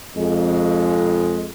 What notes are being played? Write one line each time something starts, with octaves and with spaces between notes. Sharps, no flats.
F2 G#3